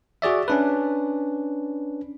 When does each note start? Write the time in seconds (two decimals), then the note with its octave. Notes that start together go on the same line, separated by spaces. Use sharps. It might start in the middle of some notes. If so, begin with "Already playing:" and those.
0.22 F#4 G#4 D5 E5
0.48 C#4 D4 B4